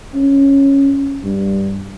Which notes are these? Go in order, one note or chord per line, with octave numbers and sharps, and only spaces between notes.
C#4
G2